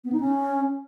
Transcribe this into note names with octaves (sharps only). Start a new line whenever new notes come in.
B3
D#4
C#4